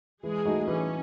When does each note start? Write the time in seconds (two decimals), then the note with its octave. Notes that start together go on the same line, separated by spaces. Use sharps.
0.23 E3 G#3 G#4
0.45 A3 D#4 F#4
0.67 E3 C#4